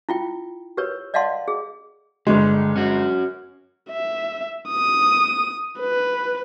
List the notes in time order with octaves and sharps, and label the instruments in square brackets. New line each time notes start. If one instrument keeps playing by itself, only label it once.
[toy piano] E4 F4 G5
G4 A#4 B4 C#5
D5 D#5 F5 F#5 A5 C6
G#4
[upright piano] G1 G#3 [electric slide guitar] D3
[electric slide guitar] C#4 F#4
[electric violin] E5
D#6
B4